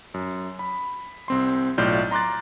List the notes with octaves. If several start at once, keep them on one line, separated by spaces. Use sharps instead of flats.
F#2
B5
C2 C4 C6
B1 A2 F4 D5 F6 G6
A#5 C6 D6 F#6 A6